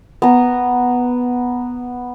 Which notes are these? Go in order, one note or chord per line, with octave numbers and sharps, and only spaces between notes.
B3 A#5